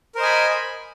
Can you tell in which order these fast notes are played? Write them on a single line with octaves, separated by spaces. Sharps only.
A#4 C5 D#5 G#5 B5